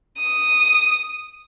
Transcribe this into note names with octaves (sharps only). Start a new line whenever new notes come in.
D#6